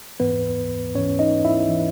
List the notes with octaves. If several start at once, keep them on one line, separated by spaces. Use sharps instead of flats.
G#2 E3 B3 B4
G#2 E3 C#4 C#5
D#4 D#5
E4 E5
E3